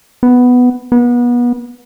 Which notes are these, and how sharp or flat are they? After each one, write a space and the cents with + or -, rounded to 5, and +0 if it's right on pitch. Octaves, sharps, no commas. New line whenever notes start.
B3 +5
B3 -30